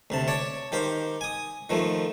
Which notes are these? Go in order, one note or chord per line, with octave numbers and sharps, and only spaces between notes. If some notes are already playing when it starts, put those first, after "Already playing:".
D2 C3 A5
C#5 D5 A5
D#3 G4 C5 F5
G#5 D#6
D#3 F3 A3